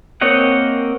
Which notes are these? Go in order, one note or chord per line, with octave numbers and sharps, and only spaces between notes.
A#3 C4 C#5 D#5 F#5